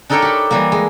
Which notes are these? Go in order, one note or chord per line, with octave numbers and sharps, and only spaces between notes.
D4 D#4 A4 A#4 C#5 G5
G4 B5
E3 G3 A#3
G#3